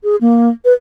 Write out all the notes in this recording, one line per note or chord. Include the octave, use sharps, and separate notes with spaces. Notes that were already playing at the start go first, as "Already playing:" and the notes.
G#4
A#3
B4